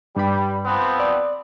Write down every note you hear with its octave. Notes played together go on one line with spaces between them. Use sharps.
G2 G3 B5
F3 B3 C4
D5